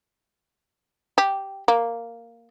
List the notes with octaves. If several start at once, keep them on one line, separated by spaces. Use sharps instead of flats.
G4
A#3